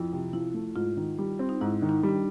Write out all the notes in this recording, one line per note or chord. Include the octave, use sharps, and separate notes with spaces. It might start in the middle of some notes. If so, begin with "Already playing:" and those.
Already playing: F2 E4
C3
F3 E4
A3
G#2 F4
D#3
G3
C4
D#4
G#2 E4
D#3
D#4
G3
D4